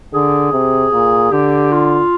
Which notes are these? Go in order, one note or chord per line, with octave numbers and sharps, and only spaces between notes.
D3 G#4
C3
A#2
D3 G4
F4